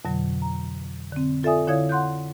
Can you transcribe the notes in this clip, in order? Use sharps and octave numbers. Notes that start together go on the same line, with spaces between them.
F2 B2 D3 F#3
A#5
D3 C4
F4 A4 D5 E5 G#5 D#6
D3 E4 C#5 F5 D#6 G#6
F#5 C6 F#6 G6